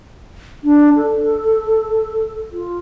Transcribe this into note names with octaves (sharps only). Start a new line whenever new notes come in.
D4
A4
F4